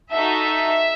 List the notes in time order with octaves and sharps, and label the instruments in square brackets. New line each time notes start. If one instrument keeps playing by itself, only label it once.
[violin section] D#4 F#4 A4 E5